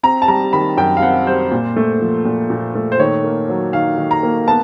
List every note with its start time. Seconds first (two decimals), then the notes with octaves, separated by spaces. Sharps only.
0.03 C4 A#5
0.22 A5
0.28 G3 A#5
0.53 D#3 B5
0.77 F#2 G5
0.97 F5
1.02 C4 F#5
1.27 G3 C5
1.52 A#2
1.76 A3
2.01 F3
2.25 A#2
2.50 A#2
2.75 A3
2.92 C5
2.99 D#3 C#5
3.24 A#3
3.49 F#3
3.73 D#3 F5
3.98 D#3
4.11 A#5
4.23 A#3
4.48 B3 A5